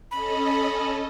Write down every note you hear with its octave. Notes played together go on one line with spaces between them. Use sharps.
C#4 A4 D#5 B5